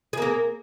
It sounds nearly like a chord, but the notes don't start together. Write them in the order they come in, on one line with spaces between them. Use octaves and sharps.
G#4 A#3 A#4